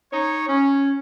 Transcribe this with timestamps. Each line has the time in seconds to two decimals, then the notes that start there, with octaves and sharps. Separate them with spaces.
0.11 D#4 C#5
0.47 C#4